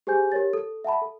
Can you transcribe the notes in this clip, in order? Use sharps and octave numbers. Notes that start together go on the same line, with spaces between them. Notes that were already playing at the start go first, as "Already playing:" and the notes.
G4 G#4 C5 G#5 G6
G4 A#4 C#5 A6
A4
E5 F#5 A5 B5
A4